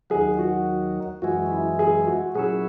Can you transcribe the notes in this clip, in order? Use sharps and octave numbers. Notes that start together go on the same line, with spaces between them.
D#2 D#3 F#3 G#4
F#4
F#2 E3 G#3 F#4
E4
G#4
F#4
A#2 F#3 C#4 E4 G#4